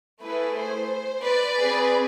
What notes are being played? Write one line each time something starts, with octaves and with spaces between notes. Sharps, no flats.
A3 E4 G#4 B4
C5
B4 D5
C4 G#4